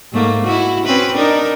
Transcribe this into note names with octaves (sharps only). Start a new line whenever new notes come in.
G#2 A3 A#3
E4 F#4
C4 C#4 B4
D4 D#4 A#4